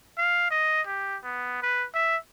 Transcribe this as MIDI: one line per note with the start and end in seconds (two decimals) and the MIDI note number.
0.18 0.50 77
0.51 0.81 75
0.87 1.17 67
1.24 1.59 59
1.63 1.86 71
1.95 2.17 76